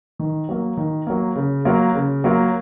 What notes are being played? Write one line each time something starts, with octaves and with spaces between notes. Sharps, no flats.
D#3
F#3 A#3
D#3
F#3 A#3
C#3
F#3 A#3 F4
C#3
F#3 A#3 F4